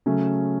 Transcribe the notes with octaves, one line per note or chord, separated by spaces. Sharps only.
C#3 F#3 A3 C#4